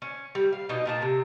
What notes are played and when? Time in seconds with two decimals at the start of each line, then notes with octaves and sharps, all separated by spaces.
0.02 C#4
0.35 G3
0.52 F5
0.69 B2 D#4 D#5
0.85 A#2 A#3 A5
1.02 C3